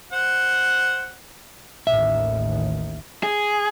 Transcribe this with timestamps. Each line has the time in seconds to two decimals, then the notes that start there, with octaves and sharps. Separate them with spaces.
0.12 C5 F#5
1.87 A1 D#2 D#3 E5
3.23 G#4